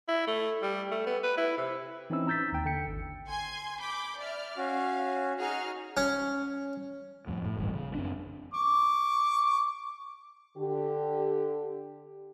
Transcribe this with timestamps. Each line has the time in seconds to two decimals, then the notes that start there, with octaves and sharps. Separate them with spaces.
0.08 E4
0.27 A3
0.62 G3
0.91 A3
1.06 B3
1.23 B4
1.38 E4
1.57 C3
2.10 E3 C4 C#4 D#4 E4 E6
2.27 A#5 E6 G6 A6 B6
2.52 D#2 G5
2.65 D3 G5 C#7
2.87 G#1
3.28 G#5 C6 G#6
3.80 B5 D6 G6
4.18 D5 E5 F6
4.57 C#4 F#4 F5
5.39 D#4 F#4 G#4 F6
5.97 C#4
7.27 F2 A2
7.45 A2
7.57 D#1 A1 G2 D#3
7.73 C#3
7.95 F#2 C4 D4
8.54 C#6 D6
10.57 D3 G4